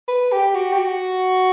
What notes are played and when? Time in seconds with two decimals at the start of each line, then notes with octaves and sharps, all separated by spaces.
0.08 B4
0.32 G4
0.55 F#4
0.73 G4
0.79 F#4